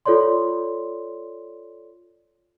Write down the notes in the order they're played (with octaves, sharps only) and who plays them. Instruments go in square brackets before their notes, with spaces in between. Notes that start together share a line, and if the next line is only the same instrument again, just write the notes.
[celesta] F4 A4 C#5 D5 C6